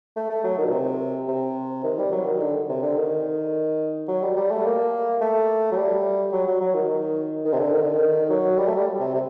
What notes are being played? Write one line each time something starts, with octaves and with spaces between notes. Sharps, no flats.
A3
A3
F#3
D#3
A#2
C3
C3
D#3
G3
F#3
D#3
D3
C3
D3
D#3
F#3
G3
G3
A3
A#3
A3
F#3
G3
F#3
F#3
F#3
D#3
D#3
C3
D3
D#3
D3
D#3
F#3
G3
A3
G3
C3
C3